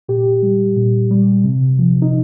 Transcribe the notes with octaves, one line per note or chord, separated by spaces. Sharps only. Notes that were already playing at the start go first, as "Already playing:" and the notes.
A#2 G4
G3
A#2
G3
C3
F3
D#4